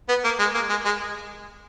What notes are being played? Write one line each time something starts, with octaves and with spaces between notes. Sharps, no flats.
B3
A#3
G#3
A#3
G#3
G#3